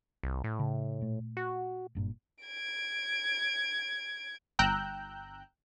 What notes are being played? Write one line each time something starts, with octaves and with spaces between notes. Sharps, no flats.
C2
A2
C#3
A#2 A3
F#4
F#1 G2 A#2
G#6 D7
G1 G5 A#5 E6 F#6 G6